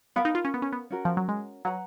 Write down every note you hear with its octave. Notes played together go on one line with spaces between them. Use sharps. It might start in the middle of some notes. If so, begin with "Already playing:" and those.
B3 A#4 F5 B5
D#4
F4
C#4
B3
C#4
B3
C#4 F#4 A#4
F3
F#3
G#3
F#3 B4 F#5 A#5